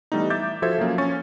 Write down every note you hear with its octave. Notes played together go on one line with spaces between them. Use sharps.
E3 G3 A3 B3 D#4
E5 D6 G6 A6
F3 F#4 A4 C5 E5 G#6
F3 F#3 A#3 C#4
C#4 C#6 A6